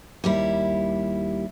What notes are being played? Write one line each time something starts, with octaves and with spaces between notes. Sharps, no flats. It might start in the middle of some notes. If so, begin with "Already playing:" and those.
D#2 G3 E4